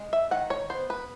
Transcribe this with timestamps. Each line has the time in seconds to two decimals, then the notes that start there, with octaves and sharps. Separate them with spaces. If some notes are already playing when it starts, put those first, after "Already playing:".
Already playing: G#3
0.13 E5
0.31 D#3 F#5
0.50 C#5
0.70 B3 C5
0.90 B4